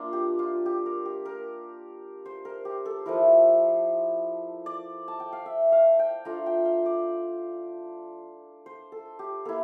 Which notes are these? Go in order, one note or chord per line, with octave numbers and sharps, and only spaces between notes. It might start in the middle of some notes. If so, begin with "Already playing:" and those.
Already playing: A#3 D4 F4
G4
F4
G4
A#4
G4
A#4
C5
A#4
G4
A4
F3 A3 E4 A#4
D5
A5
G5
F5
E5
F5
G5
A3 D4 F4 A#5
G5
F5
D5
C5
A4
G4
A#3 E4 A4